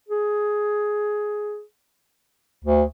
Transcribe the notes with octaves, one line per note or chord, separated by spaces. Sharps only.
G#4
D2